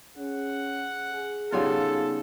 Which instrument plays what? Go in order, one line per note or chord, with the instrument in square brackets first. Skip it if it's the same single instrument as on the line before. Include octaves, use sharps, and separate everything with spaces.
[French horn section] C#4 G#4 [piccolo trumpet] F#5
[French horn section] G#4
[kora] C#3 G3 F4 [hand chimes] B3 D#4 F#5 [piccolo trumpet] A4